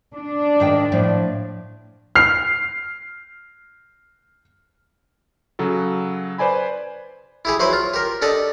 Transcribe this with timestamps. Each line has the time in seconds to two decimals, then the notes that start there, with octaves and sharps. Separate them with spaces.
0.15 D4
0.60 G#2 D#3 G5
0.92 A2 F3
2.15 F6 C7
5.59 C#3 F#3 F#4 A4
6.38 B4 C5 D5 G#5 B5
7.45 E4 G4 G#4
7.60 F#3 E4 B4 C5
7.73 F4
7.94 G4 A#4
8.22 D4 G4 A4 D5 D#5